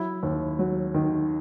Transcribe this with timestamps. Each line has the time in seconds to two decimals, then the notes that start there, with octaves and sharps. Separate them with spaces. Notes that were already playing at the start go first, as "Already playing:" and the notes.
Already playing: F#3 E4
0.23 D#2
0.59 F#3
0.94 D#3